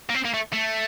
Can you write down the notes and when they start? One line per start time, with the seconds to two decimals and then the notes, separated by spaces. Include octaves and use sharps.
0.09 A#3
0.14 C4
0.25 A#3
0.34 A3
0.53 A3